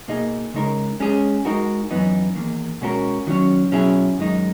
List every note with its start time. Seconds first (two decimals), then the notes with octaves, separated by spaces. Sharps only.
0.08 B2 A#3 D#4 G#4 D#5
0.54 C#3 G#3 D#4 A#4
1.00 G#3 C#4 G#4
1.45 G#3 D#4 F#4 A#4
1.91 F#2 E3 B3 D#4
2.35 E2 D#3 A#3
2.81 B2 G#3 C#4 F#4 A#4
3.27 D#3 F#3 C#4
3.72 B2 F#3 C#4 E4 G#4
4.18 F#2 D#3 G#3 D#4